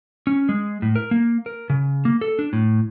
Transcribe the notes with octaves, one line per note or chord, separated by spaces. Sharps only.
C#4
G#3
A2
A#4
A#3
A#4
C#3
A#3
A4
D4
A2